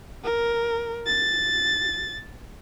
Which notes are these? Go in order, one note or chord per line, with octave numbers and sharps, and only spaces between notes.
A#4
A6